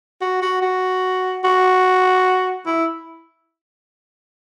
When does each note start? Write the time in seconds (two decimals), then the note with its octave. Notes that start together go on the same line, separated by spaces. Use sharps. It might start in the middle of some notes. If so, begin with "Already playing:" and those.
0.21 F#4
0.42 F#4
0.62 F#4
1.44 F#4
2.66 E4